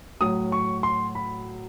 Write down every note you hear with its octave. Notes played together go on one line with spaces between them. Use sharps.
A2 F#3 D#6
C#6
C6
B5